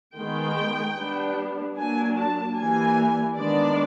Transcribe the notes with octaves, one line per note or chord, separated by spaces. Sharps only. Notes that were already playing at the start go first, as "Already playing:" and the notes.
D#3 G#3 B3 G5
G3 B3 D4
F#3 A#3 D4 G#5
A5
E3 G3 A#3 G#5
D#3 G#3 B3 D4 D5